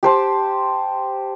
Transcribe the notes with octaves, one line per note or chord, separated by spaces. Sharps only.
G4 C5 A5